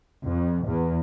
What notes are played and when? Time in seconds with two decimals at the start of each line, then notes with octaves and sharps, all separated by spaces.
0.24 F2
0.66 E2